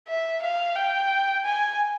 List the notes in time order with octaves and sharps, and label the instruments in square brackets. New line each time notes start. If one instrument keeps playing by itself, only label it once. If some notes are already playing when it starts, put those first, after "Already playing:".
[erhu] E5
F5
G5
G#5